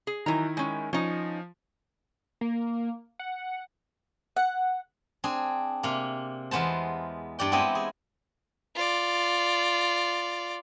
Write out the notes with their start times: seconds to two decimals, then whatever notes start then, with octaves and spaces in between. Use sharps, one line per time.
0.07 G#4
0.26 D#3 E3 F#3 D#4 E4 A#5
0.57 G#3 C#4
0.93 F3 C#4 D#4
2.41 A#3
3.19 F#5
4.36 F#5
5.24 C4 D4 G#4
5.83 C3 A#3
6.51 E2 G#3 B3 C5 A5
7.39 G2 G4 D5 G5
7.52 G#3 B3 C4 E4 G4 D#5
7.75 G#4
8.75 F4 D5